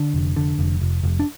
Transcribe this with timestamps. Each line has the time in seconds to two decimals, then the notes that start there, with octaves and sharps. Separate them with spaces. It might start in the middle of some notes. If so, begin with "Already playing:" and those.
Already playing: D3 D4
0.14 F1
0.36 D3
0.59 F1
0.82 F1
1.04 F1
1.20 D4